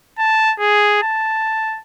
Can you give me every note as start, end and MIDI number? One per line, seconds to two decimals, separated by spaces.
0.18 0.54 81
0.59 1.00 68
1.02 1.80 81